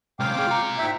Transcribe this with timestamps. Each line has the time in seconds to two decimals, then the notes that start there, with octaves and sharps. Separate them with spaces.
0.20 C3 G#3 F5 G5 D6
0.35 C4 G#4
0.47 F4 A#5
0.78 G#2 E5 G5